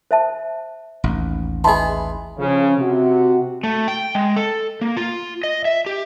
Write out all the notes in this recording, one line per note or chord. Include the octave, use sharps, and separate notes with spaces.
C5 E5 A5
A1 D#2
E3 G#4 D#5 A5 B5 C6
C#3 F3
C3 F#4
A3
G5
G#3
A4
A#3
F4
D#5
E5
G4